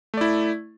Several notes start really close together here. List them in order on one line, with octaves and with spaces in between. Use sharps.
A3 D5 E4